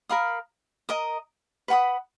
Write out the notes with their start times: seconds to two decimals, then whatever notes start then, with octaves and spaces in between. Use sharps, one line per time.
0.09 A#4 F5 B5 D#6
0.89 A#4 D#5 A#5 D#6
1.68 B4 F#5 B5 D#6